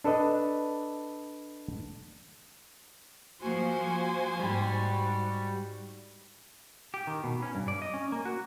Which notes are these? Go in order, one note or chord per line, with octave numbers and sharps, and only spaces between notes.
D4 A4 B4 D5 D#5
F3 A#3 F#4 C5 G#5
G#2 G3 F#4 G4
G4
D#3
B2
C#4
G2
D5
D#5
C#4
A#3
F#4